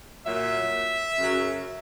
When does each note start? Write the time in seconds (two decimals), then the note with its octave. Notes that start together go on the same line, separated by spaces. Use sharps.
0.26 A#2 F#3 E5
1.18 F#2 C#3 F#3